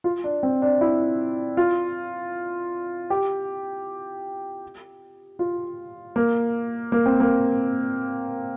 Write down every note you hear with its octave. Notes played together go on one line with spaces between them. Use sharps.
F4
D4
C4
D4
E4
F4
G4
F4
A#3
A#3
C4
A#3